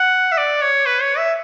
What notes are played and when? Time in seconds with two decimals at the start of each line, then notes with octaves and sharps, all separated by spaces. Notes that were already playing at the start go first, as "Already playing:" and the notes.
Already playing: F#5
0.32 E5
0.38 D5
0.62 C#5
0.86 B4
1.02 C#5
1.18 E5